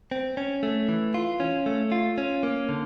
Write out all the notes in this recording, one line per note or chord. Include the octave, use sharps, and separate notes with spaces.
C4
C#4
A3
E3
F4
C#4
A3
F4
C#4
A#3
D3